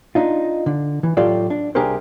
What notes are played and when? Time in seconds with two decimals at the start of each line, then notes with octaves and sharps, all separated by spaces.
0.15 D4 D#4 F4
0.66 D3
1.03 E3
1.17 A2 F#3 F4 G4 A4 D5
1.50 D4
1.75 C2 D4 G4 G#4 A#4 C5